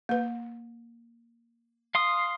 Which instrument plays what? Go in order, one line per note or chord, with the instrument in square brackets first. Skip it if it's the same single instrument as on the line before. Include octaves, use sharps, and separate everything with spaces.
[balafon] A#3 B4
[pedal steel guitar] F5 C6 D#6